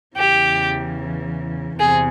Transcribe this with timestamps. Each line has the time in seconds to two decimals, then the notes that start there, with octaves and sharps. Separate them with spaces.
0.16 E2 C#3 E3 G4
1.79 E2 C3 G#4